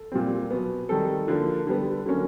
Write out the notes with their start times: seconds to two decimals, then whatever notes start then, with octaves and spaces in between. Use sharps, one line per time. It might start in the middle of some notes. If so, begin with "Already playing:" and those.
Already playing: A4
0.12 A#2 G3 C4
0.50 B2 F#3 B3
0.89 D#3 G3 C4 A4
1.28 D3 F3 A#3
1.67 D3 G3 B3
2.06 D3 F#3 A#3 C#4